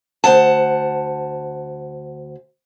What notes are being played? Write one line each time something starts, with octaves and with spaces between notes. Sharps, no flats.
D2 C5 F#5 A5